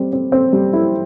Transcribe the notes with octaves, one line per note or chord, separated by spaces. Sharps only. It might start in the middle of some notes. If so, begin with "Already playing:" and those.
Already playing: G3 C4
C4
C4
G3
E4